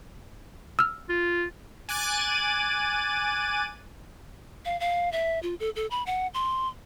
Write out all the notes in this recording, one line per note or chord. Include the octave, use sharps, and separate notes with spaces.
E6 F6
F4
G#5 D6 F#6 A6 D#7
F5
F5
E5
F4
A4
A4
B5
F#5
C6